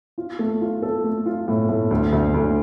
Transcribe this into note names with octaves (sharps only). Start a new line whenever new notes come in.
F4
A3
F4
A4
A3
F4
A2
A2
D2
D2
D2